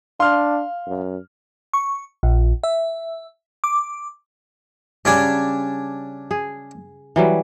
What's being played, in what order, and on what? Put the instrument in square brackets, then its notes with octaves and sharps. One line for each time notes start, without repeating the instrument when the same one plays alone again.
[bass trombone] D4 [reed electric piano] F5 [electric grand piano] C6 F6
[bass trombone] F#2
[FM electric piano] C#6
A#1
E5
D6
[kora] C#3 G3 [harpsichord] C#4 D4 G#5
[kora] G#4
E3 F#3 G3